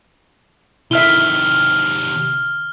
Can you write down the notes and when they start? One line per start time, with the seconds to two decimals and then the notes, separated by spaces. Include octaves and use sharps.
0.91 C3 D#3 E4 E5 F6 G7